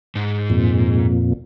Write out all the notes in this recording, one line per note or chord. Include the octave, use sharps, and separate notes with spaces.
G#2
F2 A#2